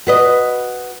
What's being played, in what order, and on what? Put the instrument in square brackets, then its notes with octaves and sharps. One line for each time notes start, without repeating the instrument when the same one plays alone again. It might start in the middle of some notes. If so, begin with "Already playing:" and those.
[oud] F#4 B4 D#5